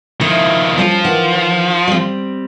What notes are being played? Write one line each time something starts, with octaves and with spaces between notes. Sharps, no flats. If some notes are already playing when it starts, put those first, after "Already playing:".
D#3 F3 E4
F3 G3 C#4 F4
D#3 E3 F#5
G3 C4